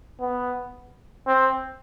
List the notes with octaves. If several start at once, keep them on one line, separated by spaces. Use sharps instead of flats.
B3
C4